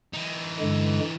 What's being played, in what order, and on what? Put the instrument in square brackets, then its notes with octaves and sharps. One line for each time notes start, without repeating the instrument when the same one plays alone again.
[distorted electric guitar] E3 D#4
[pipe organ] G2 D3 G#3